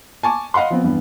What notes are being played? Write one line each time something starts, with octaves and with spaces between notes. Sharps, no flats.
G#5 A5 C#6 D6
D#5 F5 F#5 B5 C6
F3 B3 C4
E2 G2 B3